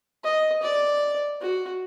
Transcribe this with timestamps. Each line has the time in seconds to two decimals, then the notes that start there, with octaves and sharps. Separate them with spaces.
0.24 D#5
0.63 D5
1.41 F#4